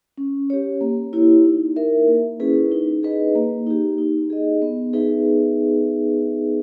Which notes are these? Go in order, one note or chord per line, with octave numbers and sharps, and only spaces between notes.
C#4
G4 C#5
A#3
E4 G4 C#5
D#4
A#4 E5
A#3
C#4 E4 G#4 B4
D#4
G#4 B4 D#5
A#3
D#4 G4
D#4
G#4 D#5
B3
D#4 G#4 B4 E5